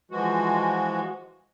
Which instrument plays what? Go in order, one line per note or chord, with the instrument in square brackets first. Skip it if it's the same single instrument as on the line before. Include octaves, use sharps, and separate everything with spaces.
[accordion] E3 F3 G#3 F#4